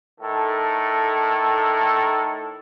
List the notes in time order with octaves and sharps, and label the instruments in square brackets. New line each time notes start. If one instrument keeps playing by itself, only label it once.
[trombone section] A2 D#3 A4